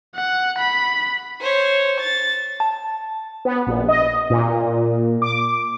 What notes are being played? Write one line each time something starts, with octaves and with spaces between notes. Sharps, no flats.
F#5
B5
C5 C#5
A6
A5
B3
A#1
D#5
A#2
D6